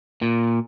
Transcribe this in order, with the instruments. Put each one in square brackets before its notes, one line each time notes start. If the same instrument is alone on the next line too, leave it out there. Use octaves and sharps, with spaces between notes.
[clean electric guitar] A#2